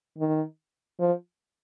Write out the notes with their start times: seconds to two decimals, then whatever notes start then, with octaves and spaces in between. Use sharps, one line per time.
0.18 D#3
0.99 F3